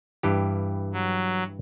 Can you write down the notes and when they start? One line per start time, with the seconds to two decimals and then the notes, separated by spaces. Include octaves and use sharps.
0.23 G2 E3 G4
0.93 F#3